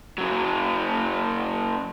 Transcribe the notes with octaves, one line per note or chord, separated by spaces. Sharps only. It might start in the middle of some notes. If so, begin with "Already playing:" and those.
C#3 F#3